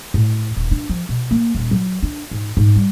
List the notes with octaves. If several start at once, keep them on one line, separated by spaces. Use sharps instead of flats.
A2
D#1
D4
F3
B2
A#3
D#1
F#3
D4
G#2
G#2
G3